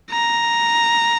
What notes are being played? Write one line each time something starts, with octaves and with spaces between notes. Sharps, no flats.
A#5